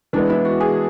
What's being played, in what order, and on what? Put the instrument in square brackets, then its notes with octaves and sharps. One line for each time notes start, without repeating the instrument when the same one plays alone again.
[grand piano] E3 G#3 B3 [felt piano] D4
[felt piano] E4
F#4
G#4